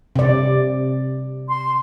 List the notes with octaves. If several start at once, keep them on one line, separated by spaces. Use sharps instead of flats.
C3 D5
C6